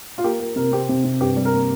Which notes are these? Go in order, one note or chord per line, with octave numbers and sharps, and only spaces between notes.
F4
A#3 G4
A#3
C3 A#4
C4 G4
C3
C3
G2 G4
G3
A#4
A#3